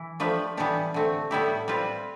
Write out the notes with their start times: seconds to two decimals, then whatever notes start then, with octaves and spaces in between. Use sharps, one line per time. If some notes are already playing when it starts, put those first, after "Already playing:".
Already playing: E3 E4
0.20 F3 A3 D4 G4 B4
0.57 E3 G3 B3 D4 G4
0.94 D3 A3 C4
1.31 A2 G3 B3 E4 G4
1.68 G3 C4 F4 B4